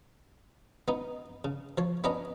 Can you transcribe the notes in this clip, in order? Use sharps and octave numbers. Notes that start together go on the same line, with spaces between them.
B3 D#4
C#3
F3 C#5
B3 C#4 D4 B4 D#5 A#5